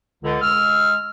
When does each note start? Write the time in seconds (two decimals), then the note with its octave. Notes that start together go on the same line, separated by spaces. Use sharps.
0.23 C#2 D3
0.42 G#3 E6 F6